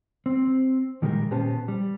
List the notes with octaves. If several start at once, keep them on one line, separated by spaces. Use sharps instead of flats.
C4
A#2 D#3 G3 G#3 G4 A#4
A#2 B3 C#4 G4 C5 A5
G3